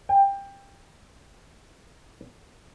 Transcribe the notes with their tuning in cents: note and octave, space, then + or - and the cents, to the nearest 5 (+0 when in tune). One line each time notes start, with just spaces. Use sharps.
G5 +20